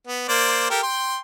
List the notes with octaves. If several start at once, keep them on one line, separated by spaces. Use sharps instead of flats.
B3
A#3 C5 D5
G4 A4 A#4
G5 C6